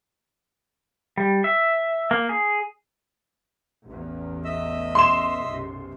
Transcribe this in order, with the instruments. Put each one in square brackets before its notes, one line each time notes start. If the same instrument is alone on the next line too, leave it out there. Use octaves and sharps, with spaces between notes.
[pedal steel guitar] G3
E5
A#3
G#4
[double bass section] A1 E2
[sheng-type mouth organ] D#5 E5 E6
[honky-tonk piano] C6 E7
[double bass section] B1 F#2 C3